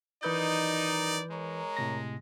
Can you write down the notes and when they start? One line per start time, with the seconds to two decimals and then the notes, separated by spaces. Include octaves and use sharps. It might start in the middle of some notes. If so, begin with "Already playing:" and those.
0.23 F#2 D#3 E3 D#4 B4 D5 G6
1.31 G#3 A#4 C#5 A#5
1.77 A2 C3 A#6